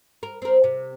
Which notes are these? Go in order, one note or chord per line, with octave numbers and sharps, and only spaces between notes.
A#4
C4 A#4
C3